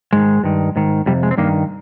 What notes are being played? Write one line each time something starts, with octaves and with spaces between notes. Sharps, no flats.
G#2 D#3 G#3
G2 D#3
G#2 D#3
F2 C3 G3
G#3
C4
G2 D#3 A#3